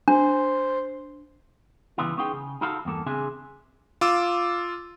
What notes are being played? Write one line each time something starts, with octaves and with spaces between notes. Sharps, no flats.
D4 C5
C#3 E3 G3 B3 E4 F4
B3 C#4 D#4 F4 G#4 G5
C#3
D#4 F4 F#4 A4 F5 B5
E2 G2 A#3 A4
C#3 C4 D4 G#4 E5 G#5
F4 D6 E6